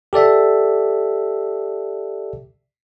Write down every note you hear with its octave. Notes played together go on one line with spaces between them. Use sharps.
G4 A4 D5 E5